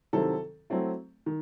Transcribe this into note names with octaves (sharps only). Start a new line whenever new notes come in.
C3 D#3 F#3 C4 E4 A4
F#3 A3 C4 E4
D#3